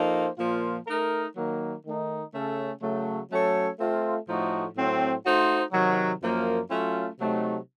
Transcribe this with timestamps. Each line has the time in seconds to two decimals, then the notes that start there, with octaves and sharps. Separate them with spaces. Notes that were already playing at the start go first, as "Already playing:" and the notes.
Already playing: F3 A#3 D#4 A4 C5
0.38 A#2 F3 A#3 F4
0.87 A3 D#4 A#4
1.36 D#3 F#3 A#3
1.84 D#3 A3 D#4
2.32 C#3 A3 C#4 A4
2.81 C#3 F#3 A3
3.29 F#3 A3 C#4 A4 C#5
3.78 A3 C4 F4
4.27 A2 F3 A3 D#4 F#4
4.75 A2 F#3 C4
5.24 A3 D#4 F#4 C5
5.72 C3 D#3 F#3
6.21 F#2 F3 A#3
6.70 F#3 A3 C#4 F4
7.18 C3 F#3 A3 D#4